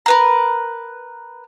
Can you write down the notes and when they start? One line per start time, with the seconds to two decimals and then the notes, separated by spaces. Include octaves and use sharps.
0.06 A#4 B4 A#5